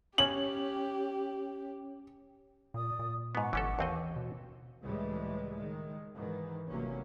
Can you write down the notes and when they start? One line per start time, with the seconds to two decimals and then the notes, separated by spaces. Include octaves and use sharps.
0.18 C#4 G4 C#5 F#7
2.74 A#2 D5 D#6
2.99 A#2
3.35 G#2 B3 F#5 C#6 D6
3.53 G1 E3 C#4 A4
3.79 D#2 E3 C4 D#5
4.16 B2
4.83 C#2 A2 E3 G3 G#3
5.54 D#3 G#3
6.14 G#2 D#3 E3
6.68 G1 G2 C3 F#3 A#3 C#4